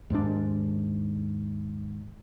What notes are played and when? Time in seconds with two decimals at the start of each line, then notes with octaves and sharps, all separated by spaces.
0.10 D#2 G#2 G#3 D4